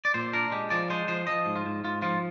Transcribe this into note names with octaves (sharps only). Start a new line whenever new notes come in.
D5
A#2 C5
D4 A#4
G#3 G4
F3 D5
G#3 C5
F3 C5
F3 D#5
G#2
F4
G#2
G#2 F4
F3 F4